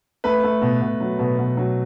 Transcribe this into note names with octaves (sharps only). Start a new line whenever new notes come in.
A3 B4
A3
B2
B2
F#3
B2
B2
F#3